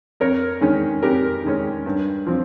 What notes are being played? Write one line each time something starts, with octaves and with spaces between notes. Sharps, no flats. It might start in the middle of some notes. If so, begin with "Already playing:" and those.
F2 A#4 C#5
D#3 G#3 C#4
F2 G4 A#4
D#3 G#3 C#4
G2
F3 C4